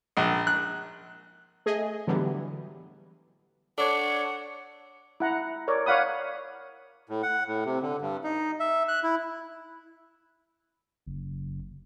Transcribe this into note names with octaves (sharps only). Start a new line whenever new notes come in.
A#1
F#6
A3 G#4 D#5
A2 D3 E3 F#3 G3 B3
D4 A4 C#5 F#5 D6
E4 F#5 A#5
A#4 C#5 D5
C#5 D5 F5 F#5 B5 D#6
A2
F#5
A2
C3
D3
G2
D#4
E5
F#6
E4
F#1